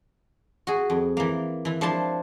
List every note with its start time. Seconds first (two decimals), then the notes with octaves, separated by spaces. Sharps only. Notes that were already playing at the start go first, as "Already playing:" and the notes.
0.67 F#4 G#4
0.90 F2
1.17 E3 A#3
1.65 E3 E4
1.81 F3 D4 E4 E5 A5 C6